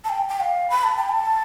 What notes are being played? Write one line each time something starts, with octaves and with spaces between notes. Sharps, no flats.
A5
G5
G5
F5
B5
A5
G5
A5